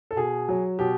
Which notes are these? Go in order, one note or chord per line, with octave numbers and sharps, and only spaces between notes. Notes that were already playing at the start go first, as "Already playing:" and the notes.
A4
B2 G#4
F#3
B2 G4